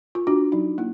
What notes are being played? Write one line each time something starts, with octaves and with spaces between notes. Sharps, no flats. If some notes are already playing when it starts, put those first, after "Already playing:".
F4
D4 F#4
F#3 D#4
A#3 E4